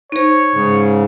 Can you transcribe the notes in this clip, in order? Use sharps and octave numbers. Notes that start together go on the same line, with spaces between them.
D#4 C5 C#5
G#2 C#3